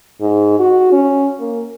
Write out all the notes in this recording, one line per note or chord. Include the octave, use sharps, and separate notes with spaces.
G#2
F#4
C#4
A#3